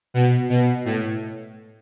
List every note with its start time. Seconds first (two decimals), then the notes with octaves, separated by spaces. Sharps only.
0.14 B2
0.50 B2
0.85 A2